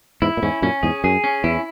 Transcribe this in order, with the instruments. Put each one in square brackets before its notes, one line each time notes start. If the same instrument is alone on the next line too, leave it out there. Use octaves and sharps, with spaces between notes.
[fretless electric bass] E2 G#2 [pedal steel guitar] E4
[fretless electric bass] A#2
[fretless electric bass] E2 G#2 [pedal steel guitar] C#4
[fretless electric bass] F#2 A#2 [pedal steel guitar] C#4
[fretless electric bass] E2 G#2 [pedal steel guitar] G#4
[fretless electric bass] F#2 [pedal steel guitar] G#4
[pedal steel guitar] C#4
[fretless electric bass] E2 [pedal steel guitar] E4